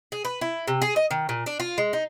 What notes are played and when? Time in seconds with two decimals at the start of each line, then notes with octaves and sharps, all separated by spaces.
0.12 G#4
0.25 B4
0.41 E4
0.68 C3
0.82 G#4
0.96 D#5
1.11 D#3
1.29 A#2
1.46 D4
1.60 F4
1.78 G#3
1.93 D#4